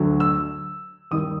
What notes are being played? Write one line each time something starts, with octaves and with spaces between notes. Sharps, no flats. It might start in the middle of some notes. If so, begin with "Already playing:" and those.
Already playing: D2 D3 F#3
E6
D#2 D#3 G3 D#6